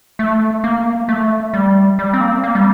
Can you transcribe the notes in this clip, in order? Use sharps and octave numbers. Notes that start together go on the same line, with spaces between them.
A3
A#3
A3
G3
G3
C4
A#3
C4
A#3
G3